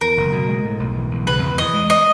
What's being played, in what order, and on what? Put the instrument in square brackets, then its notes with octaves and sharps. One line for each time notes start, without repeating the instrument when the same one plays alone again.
[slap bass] E2 [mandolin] A#4
[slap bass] F#1
B2
G#3
A2
B1
E3
B1
[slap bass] C#3 [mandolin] B4
[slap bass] E2
[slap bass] E3 [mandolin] D#5
[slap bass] G#3
[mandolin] D#5